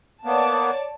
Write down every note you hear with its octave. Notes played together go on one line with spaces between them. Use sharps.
A#3 B3 C#5 D5 A5